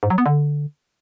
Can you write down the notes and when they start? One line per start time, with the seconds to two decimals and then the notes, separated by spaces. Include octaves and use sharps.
0.03 G#2
0.10 F#3
0.18 B3
0.26 D3